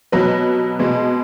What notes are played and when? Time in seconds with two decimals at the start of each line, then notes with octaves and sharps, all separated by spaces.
0.12 B2 F#3 B4
0.79 B2 G#3